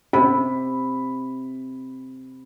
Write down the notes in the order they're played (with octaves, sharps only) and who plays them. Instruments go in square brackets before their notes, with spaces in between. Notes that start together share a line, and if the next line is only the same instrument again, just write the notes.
[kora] C3 [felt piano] B5